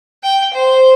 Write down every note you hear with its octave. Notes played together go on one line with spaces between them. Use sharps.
G5
C5